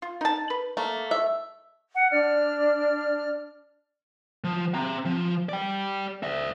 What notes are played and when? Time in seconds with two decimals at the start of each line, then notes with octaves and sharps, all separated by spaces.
0.02 F4
0.21 D#4 A5
0.50 B4
0.77 A3 A#3
1.11 E5
1.95 F#5
2.11 D4 D5 F6
4.44 F3
4.75 C4 A#5
5.05 F3
5.49 D5 G5
6.23 D5 E5